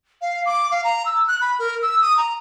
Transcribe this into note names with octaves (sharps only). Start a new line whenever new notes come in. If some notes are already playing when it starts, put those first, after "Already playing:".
F5
D6
F5
A#5
E6
F#6
B5
A#4
E6
D#6
A#5